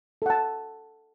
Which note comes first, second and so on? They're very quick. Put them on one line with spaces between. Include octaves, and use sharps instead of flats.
A4 F#5 A5